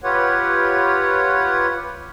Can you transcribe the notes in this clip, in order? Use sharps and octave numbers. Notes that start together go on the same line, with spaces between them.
F4 G4 B4 C#5 F#5